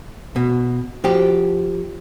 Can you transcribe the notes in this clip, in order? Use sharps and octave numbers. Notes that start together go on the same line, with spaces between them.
B2
F3 F#4 G4